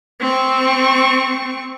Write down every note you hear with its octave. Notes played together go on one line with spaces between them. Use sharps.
C4 C#6